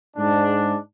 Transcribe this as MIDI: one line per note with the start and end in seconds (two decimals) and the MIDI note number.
0.17 0.75 44
0.17 0.75 62